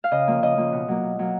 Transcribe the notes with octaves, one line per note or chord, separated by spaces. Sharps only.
F5
C#3 D#5
F3 A#3
C#3 D#5
F3 A#3
B2
F#3 A#3
B2
F#3 A#3